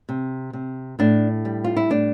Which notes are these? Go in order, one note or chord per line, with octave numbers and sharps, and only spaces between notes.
C3
C3
A2 D4
G3
F4
E4
A2 D4